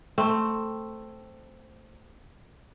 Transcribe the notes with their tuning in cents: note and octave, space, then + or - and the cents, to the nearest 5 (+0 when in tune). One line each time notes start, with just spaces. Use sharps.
A3 +5 C4 +0